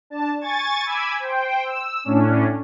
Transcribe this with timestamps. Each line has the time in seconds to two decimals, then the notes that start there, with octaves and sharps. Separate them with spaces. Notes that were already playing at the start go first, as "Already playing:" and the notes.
0.10 D4 A5
0.41 G#5 C#6 G#6 A6
0.85 G#5 B5 D6 E6 G#6
1.19 C5 G5
1.64 E6
2.04 A2 C#4 D4